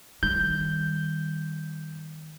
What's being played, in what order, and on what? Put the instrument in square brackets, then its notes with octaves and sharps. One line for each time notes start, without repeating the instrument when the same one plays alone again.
[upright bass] D#3 G3 [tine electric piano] G6